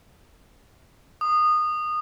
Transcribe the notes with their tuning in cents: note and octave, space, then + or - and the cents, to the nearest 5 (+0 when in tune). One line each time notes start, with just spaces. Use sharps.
D#6 -20